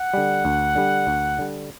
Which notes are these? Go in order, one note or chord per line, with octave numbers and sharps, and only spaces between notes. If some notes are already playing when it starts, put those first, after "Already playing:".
Already playing: F#5
D3 G3
D2
D3 G3
D2
D3 G3